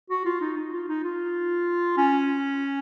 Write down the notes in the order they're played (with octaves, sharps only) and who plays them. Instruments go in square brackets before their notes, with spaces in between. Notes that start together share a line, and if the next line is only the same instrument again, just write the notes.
[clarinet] F#4
F4
D#4
D#4
F4
D#4
F4
C#4